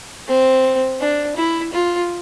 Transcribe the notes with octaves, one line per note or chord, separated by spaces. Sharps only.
C4
D4
E4
F4